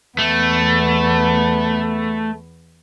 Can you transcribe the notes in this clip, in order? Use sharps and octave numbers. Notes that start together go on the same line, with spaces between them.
E2 A3 B3